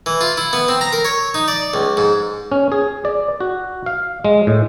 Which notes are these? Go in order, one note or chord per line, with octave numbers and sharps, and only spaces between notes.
E3
F4
E4
B3
C4
A#5
A#4
C#5
D#4
D5
C#2
G#2
C#4
G#4
D5
F#4
F5
G#3
A2